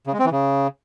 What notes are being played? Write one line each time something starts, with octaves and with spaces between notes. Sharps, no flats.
C#3
G#3
C4
E3
C#3